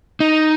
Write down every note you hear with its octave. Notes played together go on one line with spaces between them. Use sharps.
D#4